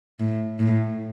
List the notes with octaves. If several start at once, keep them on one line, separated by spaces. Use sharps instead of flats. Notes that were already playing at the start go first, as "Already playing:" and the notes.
A2
A2